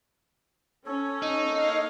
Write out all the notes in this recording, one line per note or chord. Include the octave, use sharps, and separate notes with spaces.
C#4 A4 C#5
D#4
A#3 D#5 F5